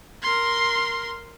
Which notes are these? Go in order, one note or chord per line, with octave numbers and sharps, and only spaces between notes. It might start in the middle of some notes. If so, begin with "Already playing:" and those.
A#4 C6